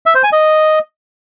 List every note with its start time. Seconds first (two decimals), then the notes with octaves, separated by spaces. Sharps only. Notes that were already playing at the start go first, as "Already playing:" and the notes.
0.06 E5
0.15 C5
0.23 G#5
0.32 D#5